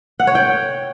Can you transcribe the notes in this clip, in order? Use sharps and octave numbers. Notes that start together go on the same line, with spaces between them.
F#5
C#5
G5